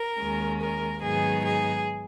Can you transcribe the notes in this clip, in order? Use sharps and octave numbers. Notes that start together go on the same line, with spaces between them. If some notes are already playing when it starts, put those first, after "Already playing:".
Already playing: A#4
D#2 D#3 G#3 C#4
A#4
G#2 D#3 F#3 B3 D#4 G#4
G#4